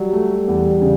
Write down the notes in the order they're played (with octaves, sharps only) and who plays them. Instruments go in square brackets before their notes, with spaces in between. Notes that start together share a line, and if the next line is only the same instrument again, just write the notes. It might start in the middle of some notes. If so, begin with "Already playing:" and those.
Already playing: [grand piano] F#3 [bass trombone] G3
[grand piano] A3
E2
C#3